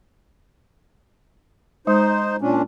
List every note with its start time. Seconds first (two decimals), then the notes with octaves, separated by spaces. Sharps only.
1.87 G#3 D#4 C5
2.41 A#2 C#4 D4